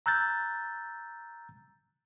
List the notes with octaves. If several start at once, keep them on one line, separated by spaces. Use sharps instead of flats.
A#5 E6 F#6 G6 A6